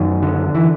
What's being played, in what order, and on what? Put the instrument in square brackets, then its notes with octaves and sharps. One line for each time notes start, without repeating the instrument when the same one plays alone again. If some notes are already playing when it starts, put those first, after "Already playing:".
Already playing: [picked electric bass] F#2 D#3
D3
E3